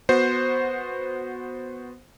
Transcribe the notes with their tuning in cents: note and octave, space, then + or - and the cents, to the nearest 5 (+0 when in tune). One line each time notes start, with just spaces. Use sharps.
B3 +0 F#4 -15 C5 +0